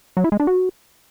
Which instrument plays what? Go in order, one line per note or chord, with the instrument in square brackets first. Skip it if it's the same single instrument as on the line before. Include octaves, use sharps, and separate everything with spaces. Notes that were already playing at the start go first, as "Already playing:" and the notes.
[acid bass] F#3
E4
G#3
D4
F#4